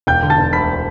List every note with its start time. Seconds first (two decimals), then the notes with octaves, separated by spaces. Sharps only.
0.07 E1 G5 G6
0.23 D3
0.30 A5 A6
0.38 E1
0.53 D2 B5 B6